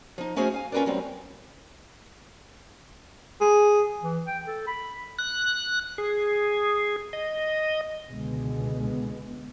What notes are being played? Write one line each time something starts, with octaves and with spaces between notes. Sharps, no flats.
F3 D#4
A3 C#4 F#4 G#4 C5 F5
F5 G#5
C#4 F4 A#4 B4 D5
A2 F#3 G3 C4
G#4
E3
G5
A4
B5
F#6
G#4
D#5
C#2 B2 D3 G#3 B3